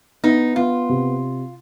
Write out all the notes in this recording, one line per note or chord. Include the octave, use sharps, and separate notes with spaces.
B3 D#4
B3 F4
C3